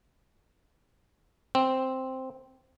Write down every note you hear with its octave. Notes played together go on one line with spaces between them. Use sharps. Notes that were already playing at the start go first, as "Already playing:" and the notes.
C4